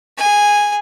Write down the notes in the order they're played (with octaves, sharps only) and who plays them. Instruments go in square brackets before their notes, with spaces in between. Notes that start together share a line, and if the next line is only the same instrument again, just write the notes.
[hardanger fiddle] G#4 G#5